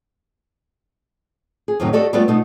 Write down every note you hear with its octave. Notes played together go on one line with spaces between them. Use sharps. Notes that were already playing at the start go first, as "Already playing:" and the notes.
G#4
F2 A2 C3 D#3 F#3
F#4 G4 A4 D5 D#5
G3 A3 B3 F4 F#4 D5
B2 A3 B3 D#4 F4